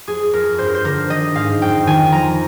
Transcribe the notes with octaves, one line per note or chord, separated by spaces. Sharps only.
F2 G#4
F2 A#4
G2 C5
A#4
C5
D3 A#4
D#3 D#5
G#2 F5
F2 G5
D#3 G#5
F3 A#5